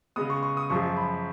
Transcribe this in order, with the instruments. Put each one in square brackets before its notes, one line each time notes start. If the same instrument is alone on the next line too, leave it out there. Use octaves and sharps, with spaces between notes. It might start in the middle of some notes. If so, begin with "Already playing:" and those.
[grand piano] C#3 G#3 B3 D#6
C#6
C#6
D#6
F#2 F3 G#3 C#6
B5